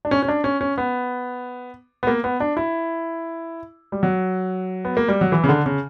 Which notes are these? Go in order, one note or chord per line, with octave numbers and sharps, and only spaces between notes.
D4
C#4
C#4
D4
C#4
C#4
B3
B3
A#3
B3
D4
E4
G3
F#3
B3
A#3
G3
F#3
E3
C#3
D3
C#3